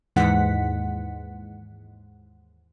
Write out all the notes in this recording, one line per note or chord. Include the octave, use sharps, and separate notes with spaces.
D#2 G#2 E3 G#3 F#5 B6